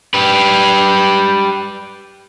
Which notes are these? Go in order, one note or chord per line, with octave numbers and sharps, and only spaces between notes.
G4 B4